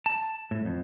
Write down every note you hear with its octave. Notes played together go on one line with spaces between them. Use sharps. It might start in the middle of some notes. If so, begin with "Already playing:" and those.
A5
A2
F2